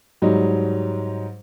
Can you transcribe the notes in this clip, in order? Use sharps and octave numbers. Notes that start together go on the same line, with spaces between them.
G#2 F#3 G3 D#4